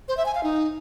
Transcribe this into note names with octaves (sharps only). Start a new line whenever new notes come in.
C5
E5
G#5
F5
D#4